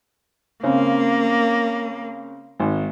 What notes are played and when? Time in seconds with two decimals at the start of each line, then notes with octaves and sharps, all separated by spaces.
0.63 C#3 A#3 C4 C#4
2.60 G#1